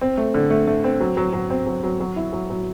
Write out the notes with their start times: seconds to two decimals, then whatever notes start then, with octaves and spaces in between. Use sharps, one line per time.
0.01 C4
0.17 A3
0.34 D3
0.50 A3
0.67 A3
0.84 C4
1.00 F#3
1.17 F#3
1.33 F#3
1.50 C4
1.67 F#3
1.83 F#3
2.00 F#3
2.16 E4
2.33 F#3
2.50 F#3